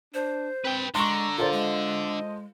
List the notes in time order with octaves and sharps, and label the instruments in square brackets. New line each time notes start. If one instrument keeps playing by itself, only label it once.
[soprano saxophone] D4 [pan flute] C5
[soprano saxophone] C4 [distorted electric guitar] B4 G5
[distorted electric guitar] D3 [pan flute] G#3 [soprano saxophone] A#5 [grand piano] C6 C#6
[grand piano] F4 A4 C5 [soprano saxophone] A#4 [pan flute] D5
[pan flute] G#3 [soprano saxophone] D#5